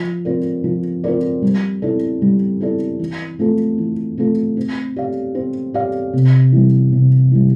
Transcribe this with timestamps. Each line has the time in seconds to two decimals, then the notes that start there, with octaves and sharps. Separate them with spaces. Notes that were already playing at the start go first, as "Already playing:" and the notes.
Already playing: F3
0.25 C4 F4 A#4 D5
0.64 F3
1.04 C4 F4 A#4 D5
1.42 G3
1.82 C4 E4 A4 D5
2.22 G3
2.60 C4 E4 A4 D5
3.00 E3
3.39 A3 C4 F4 A4
3.78 E3
4.17 A3 C4 F4 A4
4.57 C4
4.96 G4 D5 F5
5.35 C4
5.74 G4 D5 F5
6.13 C3
6.52 E3 G3
6.92 C3
7.31 E3 G3